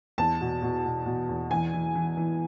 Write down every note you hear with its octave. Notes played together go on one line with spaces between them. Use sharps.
E2 A5
B2
B2
B2
B2
E2
E3 G#5
E3
E3
E3